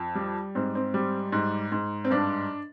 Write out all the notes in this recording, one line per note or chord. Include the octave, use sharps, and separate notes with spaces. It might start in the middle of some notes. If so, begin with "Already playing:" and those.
Already playing: F2
G3
G#2 C4
C4
G3
G#2
G#2
C4
G2 D4